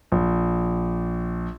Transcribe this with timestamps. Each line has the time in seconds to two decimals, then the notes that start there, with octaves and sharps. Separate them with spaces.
0.12 A#1